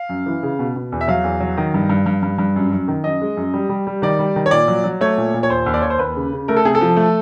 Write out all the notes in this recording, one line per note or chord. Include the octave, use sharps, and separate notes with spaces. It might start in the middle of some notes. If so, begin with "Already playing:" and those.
Already playing: F5
F#2
E3
C#3
B2
B2
E2
E5
F#3 F5
E2
F#3
D#3
G2
G2
G2
G2
G2
F#2
F#2
D#3
F#2 D#5
G#3
F#2
G3
G3
G3
D#3 D5
G3
D#3
C#5
A#2 D5
F#3
F#3
A3 C#5
A#2
A#2
C#5
D#2 C5
D#2
D5
D#2 C#5
C5
D#2 B4
C#3
C#3
A3 A#4
A4
C3 G#4
A4
F3
A3